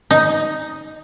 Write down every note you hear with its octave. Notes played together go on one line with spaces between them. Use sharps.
D#4